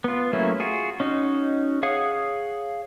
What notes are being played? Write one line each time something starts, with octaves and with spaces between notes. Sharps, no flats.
B3 F4
F#3 A3 A#3 C#4 E4
F4 F#4 G#4
C#4 D#4 F#4
G#4 C#5 F5 F#5 D#6